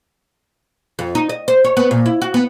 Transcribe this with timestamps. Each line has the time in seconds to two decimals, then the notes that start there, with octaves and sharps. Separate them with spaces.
0.99 F2
1.15 D#4
1.29 D#5
1.48 C5
1.64 C#5
1.77 B3
1.91 A#2
2.06 E4
2.22 F#4
2.34 B3